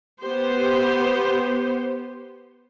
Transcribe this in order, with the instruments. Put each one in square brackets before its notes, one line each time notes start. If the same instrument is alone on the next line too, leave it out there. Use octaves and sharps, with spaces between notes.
[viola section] B3 G4 C5